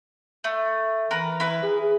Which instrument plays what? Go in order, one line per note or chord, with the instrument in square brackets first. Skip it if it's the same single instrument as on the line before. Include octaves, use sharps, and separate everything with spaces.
[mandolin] A3
[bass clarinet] E3 [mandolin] A#4 B4
[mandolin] E4 B4
[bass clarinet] G#4